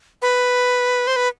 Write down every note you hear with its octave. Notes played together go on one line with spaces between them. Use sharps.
B4
C5
B4